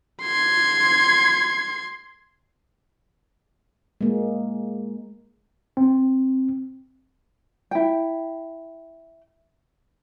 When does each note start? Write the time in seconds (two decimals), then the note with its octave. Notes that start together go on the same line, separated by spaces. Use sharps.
0.23 C6 G#6
4.01 G#3 A#3
5.77 C4
7.71 E4 G5